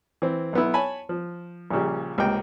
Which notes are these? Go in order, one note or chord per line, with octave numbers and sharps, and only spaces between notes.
E3 C4
B1 B3 E4
C#5 G#5 A5 B5
F3
A#1 A#2 C#3 G3
C#2 C3 A#3 D#5 G5